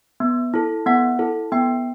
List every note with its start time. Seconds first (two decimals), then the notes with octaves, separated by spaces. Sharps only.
0.20 B3
0.54 E4 A4
0.86 B3 F#5
1.19 E4 A4
1.52 B3 G5